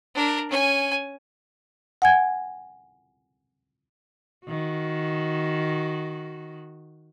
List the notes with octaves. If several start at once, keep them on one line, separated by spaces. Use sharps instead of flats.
D4 A#4
C#4 G#5
F#5 G#5 G#6
D#3 F#4